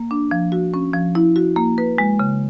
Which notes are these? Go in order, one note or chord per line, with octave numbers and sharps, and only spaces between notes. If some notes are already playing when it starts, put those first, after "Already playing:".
Already playing: A#3
D4
F3
F#4
C#4
F3
E4
F#4
A#3
B4
G#3
C#3